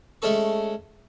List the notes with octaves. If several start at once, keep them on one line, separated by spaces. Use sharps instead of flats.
G#3 A3 C#4 A4 C#6